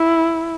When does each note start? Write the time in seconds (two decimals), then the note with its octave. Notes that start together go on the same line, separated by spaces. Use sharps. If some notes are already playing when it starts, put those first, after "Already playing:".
Already playing: E4